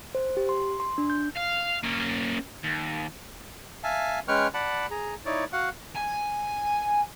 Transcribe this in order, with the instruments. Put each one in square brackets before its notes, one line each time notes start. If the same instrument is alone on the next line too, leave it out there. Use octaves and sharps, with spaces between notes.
[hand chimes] C5
G4
C6
C6
D4
G6
[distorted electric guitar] F5
A#3 C#4
D#2
[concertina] E5 F5 G#5 A5
G#3 C#4 B4 G5 C#6 F6
D5 F#5 A5 B5
G#4 A#5
D#4 E4 C#5 D5
F#4 F5 F#5
[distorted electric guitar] G#5